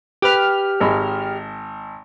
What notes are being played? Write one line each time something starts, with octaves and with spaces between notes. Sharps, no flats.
G4 B4 F6 F#6
G#1 G#3 B5